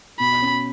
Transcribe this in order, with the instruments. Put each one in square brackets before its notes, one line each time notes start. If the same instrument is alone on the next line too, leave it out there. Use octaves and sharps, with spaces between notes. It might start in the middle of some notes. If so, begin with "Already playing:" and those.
[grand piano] B2 [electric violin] B5
[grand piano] C#4